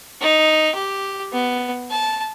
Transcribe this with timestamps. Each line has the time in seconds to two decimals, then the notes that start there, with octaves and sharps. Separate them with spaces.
0.21 D#4
0.75 G4
1.33 B3
1.91 A5